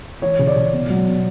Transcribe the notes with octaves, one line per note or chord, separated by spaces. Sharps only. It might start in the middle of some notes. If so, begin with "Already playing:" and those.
E3 C#5
C#3
D5
C#3
B2
F#3
B2